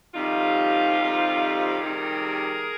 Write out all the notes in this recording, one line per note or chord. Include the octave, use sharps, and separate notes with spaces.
F2 C3 D#3 G3 D#4 F4
F2 C3 D#3 G3
F2 C3 D#3 G3 G#4 A#4